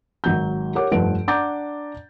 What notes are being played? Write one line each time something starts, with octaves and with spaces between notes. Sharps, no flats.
G#1 F#3 A#5 G6
G4 A#4 C#5 F#5 D6
F1 G2 F3 F#5 D7
D4 F#5 A#5 D6 G6 A6